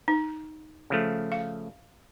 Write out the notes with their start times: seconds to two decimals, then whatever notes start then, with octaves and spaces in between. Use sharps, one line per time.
0.08 D#4
0.90 C#3 F3 A3
1.32 F5